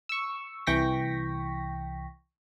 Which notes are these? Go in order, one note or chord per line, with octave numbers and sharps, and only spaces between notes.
C#6 E6
C2 E3 G5 C#6 A#6 B6